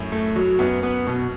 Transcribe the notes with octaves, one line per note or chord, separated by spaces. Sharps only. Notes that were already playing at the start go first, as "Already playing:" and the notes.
Already playing: F#2 A2
A3
F#3
F#2 B3
B3
B2